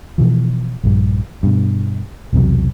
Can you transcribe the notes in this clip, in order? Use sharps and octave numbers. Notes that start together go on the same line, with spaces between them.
B2 E3 F3
A#1 G2
G2 B2
B1 E2 C3 F#3